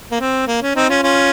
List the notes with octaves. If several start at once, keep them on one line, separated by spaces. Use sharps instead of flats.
A#3
C4
A#3
C#4
C4 D#4
C#4 F4
C#4 F4